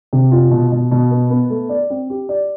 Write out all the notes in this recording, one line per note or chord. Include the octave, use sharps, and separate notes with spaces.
C3
F4
B2
B2
B2
B3
B3
A3
D5
C4
G4
D5